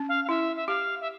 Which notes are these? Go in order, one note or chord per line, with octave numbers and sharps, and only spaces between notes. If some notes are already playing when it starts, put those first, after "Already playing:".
Already playing: C#4
F5
F5
E4 E5
E5
G4 F5
E5